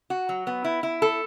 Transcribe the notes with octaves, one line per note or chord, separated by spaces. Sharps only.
F#4
F#3
B3
E4
E4
A4